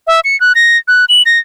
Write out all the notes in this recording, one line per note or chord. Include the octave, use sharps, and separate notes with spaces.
E5
C#7
F#6
A#6
F#6
F#7
A#6